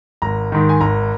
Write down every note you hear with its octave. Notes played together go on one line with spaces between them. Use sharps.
G#1 A#5
G#2 D#3
G#5
G#1 A#5